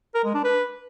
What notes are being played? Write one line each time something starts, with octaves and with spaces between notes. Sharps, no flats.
A#4
G#3
D4
B4